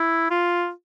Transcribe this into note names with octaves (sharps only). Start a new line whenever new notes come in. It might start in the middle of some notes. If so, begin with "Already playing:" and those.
Already playing: E4
F4